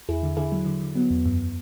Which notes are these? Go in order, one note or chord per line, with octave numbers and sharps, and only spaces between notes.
E2 E4 G#4
D3
D3 E4 G#4
F#3
D3
D3
F#3 B3
E2
F#2